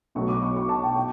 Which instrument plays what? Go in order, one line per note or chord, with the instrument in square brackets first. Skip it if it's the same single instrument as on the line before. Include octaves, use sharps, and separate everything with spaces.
[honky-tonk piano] B1 B2 F#3 A3 C#6
D6
C#6
C#6
A5
G5
G5